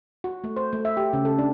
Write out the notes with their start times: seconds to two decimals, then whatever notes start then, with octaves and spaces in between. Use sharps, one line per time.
0.24 F#4
0.44 A3
0.57 C5
0.73 A3
0.85 E5
0.97 G4
1.13 C#3
1.25 A4
1.38 D4